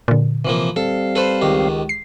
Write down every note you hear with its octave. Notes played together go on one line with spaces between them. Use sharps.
A#2 D3
C3 E3 F3 A#3
G3 C4 A4 F5
A4 B4 C5
C#2 D#3 G4
C7